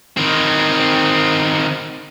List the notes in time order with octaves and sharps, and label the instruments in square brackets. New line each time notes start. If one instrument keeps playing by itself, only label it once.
[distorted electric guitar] D#3 C4